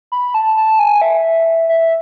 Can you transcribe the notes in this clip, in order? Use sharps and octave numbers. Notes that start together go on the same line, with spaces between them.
B5
A5
A5
G#5
E5
E5